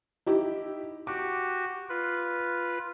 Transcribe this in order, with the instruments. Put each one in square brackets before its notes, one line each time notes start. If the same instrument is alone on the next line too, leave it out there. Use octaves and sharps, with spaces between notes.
[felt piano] D#4 E4 G4
[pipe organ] F#4 G4 [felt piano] D6
[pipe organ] F4 B4